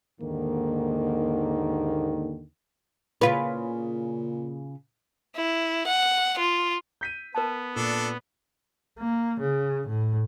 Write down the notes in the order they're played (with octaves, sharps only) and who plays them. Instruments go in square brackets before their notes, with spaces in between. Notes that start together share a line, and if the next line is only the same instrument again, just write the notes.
[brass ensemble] D#2 G#2 D3 D#3 A#3
[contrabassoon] A#2 [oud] C#3 F4 B4
[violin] E4
F#5
F4
[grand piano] G6 B6 D#7
[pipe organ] B3 [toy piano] A#4 A5
[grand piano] A#2 [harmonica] D4 A4
[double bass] A#3
C#3
A2